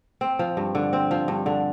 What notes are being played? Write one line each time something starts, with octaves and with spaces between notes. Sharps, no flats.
C4
F3
G2
D3
C4
F3
G2
D3